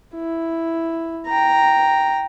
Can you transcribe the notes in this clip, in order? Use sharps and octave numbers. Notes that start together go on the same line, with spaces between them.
E4
G5 A#5